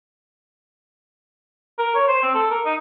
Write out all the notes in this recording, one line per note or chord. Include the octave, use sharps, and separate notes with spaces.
A#4
C#5
C5
C4
A4
A#4
D#4